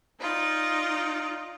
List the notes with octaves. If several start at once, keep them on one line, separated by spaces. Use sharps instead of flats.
D#4 F4 D5